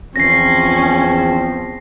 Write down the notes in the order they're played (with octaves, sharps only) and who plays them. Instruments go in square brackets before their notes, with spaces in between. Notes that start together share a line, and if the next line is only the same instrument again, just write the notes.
[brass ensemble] E2 F3 C4 [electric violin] C#4 [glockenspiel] A#6 C7